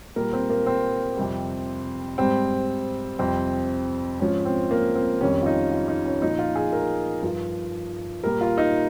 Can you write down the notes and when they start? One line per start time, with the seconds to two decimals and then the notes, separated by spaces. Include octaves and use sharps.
0.16 A#2 G3 A#4
0.33 C4
0.50 A#3
0.66 C4
1.17 F2 C3 G3
2.18 G#2 G3 C4
3.19 F2 C3 G3 C4
4.20 G#2 F3 C#4
4.45 C4
4.71 A#3
4.95 C4
5.21 F2 D#3 G3 C#4
5.42 F4
5.46 D#4
5.71 F4
5.88 D#4
6.06 C#4
6.22 A#2 F3 D#4
6.39 F4
6.56 G#4
6.73 A#4
7.23 G2 F3
8.24 A#2 G3 A#4
8.41 F4
8.58 D#4